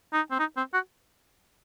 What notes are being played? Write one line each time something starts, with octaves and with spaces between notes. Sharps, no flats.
D#4
C4
D#4
C4
F#4